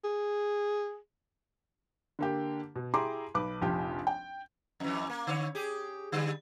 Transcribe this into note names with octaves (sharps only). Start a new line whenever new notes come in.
G#4
D3 A#3 G4
B2
E4 G4 G#4 A#5 C6 D6
B1 B4 D6
F1 A#1 F3 G4
G5
F2 E3
A#3
D3 C#5
G4 G#4
D3 G3